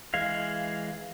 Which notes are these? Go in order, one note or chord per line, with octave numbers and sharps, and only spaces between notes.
E3 G#3 F5